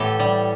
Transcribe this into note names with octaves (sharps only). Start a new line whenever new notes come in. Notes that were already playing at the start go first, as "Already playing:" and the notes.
Already playing: A2 E3 B3 G4 A4
G3